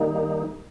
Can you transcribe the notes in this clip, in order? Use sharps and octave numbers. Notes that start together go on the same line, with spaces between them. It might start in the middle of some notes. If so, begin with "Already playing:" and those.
Already playing: D#3 G3 A#3 D#4